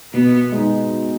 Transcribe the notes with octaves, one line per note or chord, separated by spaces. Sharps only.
B2 B3
G#3 D#4